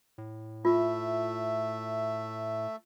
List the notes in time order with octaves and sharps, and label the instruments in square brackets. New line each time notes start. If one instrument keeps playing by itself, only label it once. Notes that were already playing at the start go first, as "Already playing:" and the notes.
[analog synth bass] A2
[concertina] A3 E5 [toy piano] F4